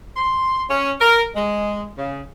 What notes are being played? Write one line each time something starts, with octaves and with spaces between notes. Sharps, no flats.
C6
C#4
A#4
G#3
C#3